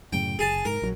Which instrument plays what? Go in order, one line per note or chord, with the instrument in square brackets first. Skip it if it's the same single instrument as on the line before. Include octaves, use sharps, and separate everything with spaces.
[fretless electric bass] F#2 A2 C#3 [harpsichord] G5
[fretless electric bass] F#1 [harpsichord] G#4 A5
[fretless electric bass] G#2 [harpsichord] A#4
[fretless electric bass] A#1 F3 F#3